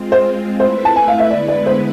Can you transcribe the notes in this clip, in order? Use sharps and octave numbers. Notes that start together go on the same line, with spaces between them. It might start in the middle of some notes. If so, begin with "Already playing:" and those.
Already playing: G#3 C4 F4
C5
A3 E4 B4 C5 E5
A5
G#5
F5
E5
D3 G#3 B3 E4 B4 D5
D5
C5